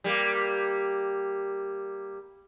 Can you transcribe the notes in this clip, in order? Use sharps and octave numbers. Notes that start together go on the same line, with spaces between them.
G3 A#3